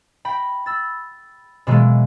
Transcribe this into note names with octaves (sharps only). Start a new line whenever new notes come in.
G5 B5 A#6
B5 E6 A6
B2 E3 F#3 G#3 A#3